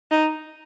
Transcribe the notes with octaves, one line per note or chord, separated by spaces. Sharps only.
D#4